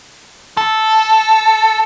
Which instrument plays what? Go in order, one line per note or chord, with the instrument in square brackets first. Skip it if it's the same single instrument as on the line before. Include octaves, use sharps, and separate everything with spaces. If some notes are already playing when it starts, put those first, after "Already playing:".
[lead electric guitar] A4